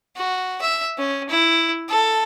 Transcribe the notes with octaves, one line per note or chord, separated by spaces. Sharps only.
F#4
E5
C#4
E4
A4